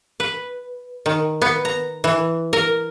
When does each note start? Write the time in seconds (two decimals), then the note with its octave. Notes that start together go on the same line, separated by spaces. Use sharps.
0.20 B4
1.06 D#3
1.42 B3
1.65 A#5
2.04 E3
2.53 A#4